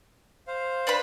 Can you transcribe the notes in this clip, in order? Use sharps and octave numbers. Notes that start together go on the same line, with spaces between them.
C5 F5
D4 B4 B5